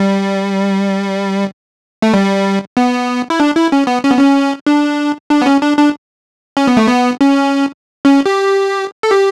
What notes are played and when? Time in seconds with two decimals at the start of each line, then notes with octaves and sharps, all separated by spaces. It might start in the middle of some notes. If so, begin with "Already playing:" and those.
Already playing: G3
2.02 A3
2.14 G3
2.77 B3
3.30 E4
3.40 D4
3.56 E4
3.72 C#4
3.87 B3
4.03 C#4
4.11 B3
4.19 C#4
4.67 D4
5.30 D4
5.42 B3
5.46 C#4
5.62 D4
5.78 D4
6.57 C#4
6.67 B3
6.77 A3
6.88 B3
7.21 C#4
8.05 C#4
8.26 G4
9.03 A4
9.11 G4